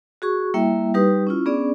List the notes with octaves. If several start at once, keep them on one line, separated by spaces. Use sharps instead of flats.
F#4 G#4 C#6
G3 A#3 E4 E5 G5
G3 D#4 G4 B4 D#6
C#4 E4 F4
B3 C#4 D4 G#4 D5